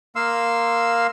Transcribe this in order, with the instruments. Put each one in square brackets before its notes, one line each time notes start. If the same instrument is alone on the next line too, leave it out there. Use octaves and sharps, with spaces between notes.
[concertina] A#3 F5 C6 E6